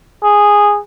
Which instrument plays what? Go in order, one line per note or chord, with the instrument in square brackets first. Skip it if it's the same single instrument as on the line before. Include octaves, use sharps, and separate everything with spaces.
[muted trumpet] G#4